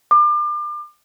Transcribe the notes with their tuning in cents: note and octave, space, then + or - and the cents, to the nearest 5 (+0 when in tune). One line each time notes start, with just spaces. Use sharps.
D6 +35